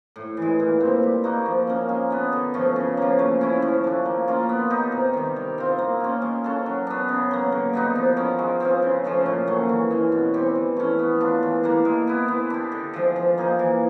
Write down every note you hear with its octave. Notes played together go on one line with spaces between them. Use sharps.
A2
E3 G#3
A#2
G3 C4
G3
A#3 D#4 F#4
F3
A#3 C#4
G#3
B3 D4
D3
F3 A3 C#4
C#3
F3 A#3
A3
C#4 E4
F3
A3 D4
A#3
C#4 F4 A#4
B3
D#4 G4
C3
D#3 G3
G3
C4 F4
A#3
C#4 F4
G#3
C#4 F#4 A4
F#3
B3 D4
C#3
F#3 A#3
D3
G3 B3 D#4
F3
G#3 C#4
G#3
C4 F4 G#4
C#3
F3 A3 C#4
A#2
F#3 A3 C#4
E3
G#3 C#4
B2
G3 C4
E3
A3 C#4
B3
D4 F4
E3
G3 A#3 D4
G#3
B3 E4
B3
D4 G4
D3
F3 G#3
F3
A#3 D#4 G#4
E3